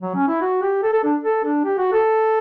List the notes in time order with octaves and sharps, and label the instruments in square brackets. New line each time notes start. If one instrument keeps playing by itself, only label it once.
[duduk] F#3
C#4
E4
F#4
G4
A4
A4
D4
A4
D4
G4
F#4
A4